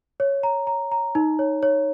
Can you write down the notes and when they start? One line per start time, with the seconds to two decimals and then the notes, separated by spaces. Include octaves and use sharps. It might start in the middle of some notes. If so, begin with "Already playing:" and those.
0.20 C#5
0.43 A#5
0.67 A#5
0.92 A#5
1.15 D#4
1.39 C#5
1.63 C#5